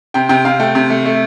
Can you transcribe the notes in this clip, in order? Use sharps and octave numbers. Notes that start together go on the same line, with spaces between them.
C3 G5
C3 G5
C3 F5
A3 G5
C3
A3
A3